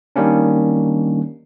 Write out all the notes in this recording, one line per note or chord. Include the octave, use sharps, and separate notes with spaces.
D#3 G3 A#3 C#4 D4